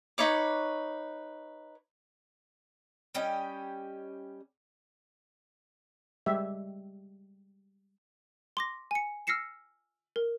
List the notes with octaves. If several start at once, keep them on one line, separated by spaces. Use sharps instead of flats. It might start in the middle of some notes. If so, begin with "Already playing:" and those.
D#4 B4 C#5 D6
G3 C#4 G4 D#5
G3 G#3 G4 E5
C6 D6 A#6
G#5 C#7
E6 F6 A#6 C7 C#7 E7
A#4